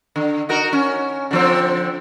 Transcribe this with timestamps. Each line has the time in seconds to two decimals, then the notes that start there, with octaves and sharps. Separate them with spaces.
0.16 D3
0.49 D#4 F#4 A#4
0.73 C#4
1.31 D3 F3 C4